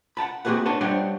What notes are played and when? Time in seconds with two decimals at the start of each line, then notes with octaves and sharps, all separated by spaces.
0.17 F#5 G5 A5 B5
0.45 A#3 C4 F#4 G#4 B4 F#5
0.65 D4 B4 C#5 F#5 A5 C6
0.81 G3 D4 C5 C#5 F#5 G5